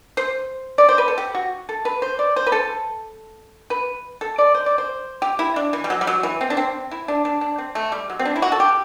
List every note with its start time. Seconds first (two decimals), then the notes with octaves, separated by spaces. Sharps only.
0.17 C5
0.78 D5
0.89 C5
0.98 B4
1.08 A4
1.18 G4
1.35 F#4
1.69 A4
1.85 B4
2.02 C5
2.19 D5
2.36 C5
2.47 B4
2.52 A4
3.70 B4
4.21 A4
4.38 D5
4.55 C5
4.66 D5
4.78 C5
5.22 G4
5.39 E4
5.56 D4
5.73 E3
5.84 G3
5.90 F#3
6.01 G3
6.07 F#3
6.23 E3
6.41 C4
6.50 D4
6.57 C4
6.91 E4
7.08 D4
7.25 D4
7.41 D4
7.58 C4
7.75 A3
7.92 G3
8.10 F#3
8.19 C4
8.25 D4
8.36 E4
8.42 F#4
8.52 A4
8.60 G4